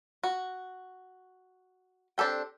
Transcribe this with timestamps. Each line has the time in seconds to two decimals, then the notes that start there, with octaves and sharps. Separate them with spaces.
0.23 F#4
2.18 C4 D4 G4 A4 G5